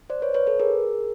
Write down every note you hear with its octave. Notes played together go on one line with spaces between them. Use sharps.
C5 D5
B4 C#5
B4 C#5
A4 B4
G#4 A#4